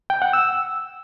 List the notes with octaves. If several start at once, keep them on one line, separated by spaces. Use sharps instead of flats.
G5
F#5
E6